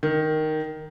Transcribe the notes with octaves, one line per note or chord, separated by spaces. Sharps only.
D#3